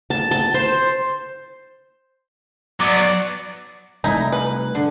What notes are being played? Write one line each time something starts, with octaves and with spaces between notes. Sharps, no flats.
A5
A5
C5
F#3 B3 D5
C3 G3 A3 D#4 E4 A#5
B4
D3